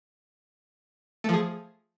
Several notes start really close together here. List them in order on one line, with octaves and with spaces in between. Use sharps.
A3 F3 G#4